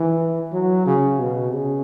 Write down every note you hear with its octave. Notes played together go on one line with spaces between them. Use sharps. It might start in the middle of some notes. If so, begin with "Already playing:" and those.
Already playing: E3
F#3
C#3
B2
C#3